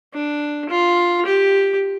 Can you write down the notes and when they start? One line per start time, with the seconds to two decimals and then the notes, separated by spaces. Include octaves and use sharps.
0.13 D4
0.69 F4
1.25 G4